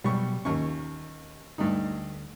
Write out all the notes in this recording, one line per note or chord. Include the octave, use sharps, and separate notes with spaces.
B2 F#3 G3 B5 C#6
D#2 C#4 C#6
D2 G2 A3 D#4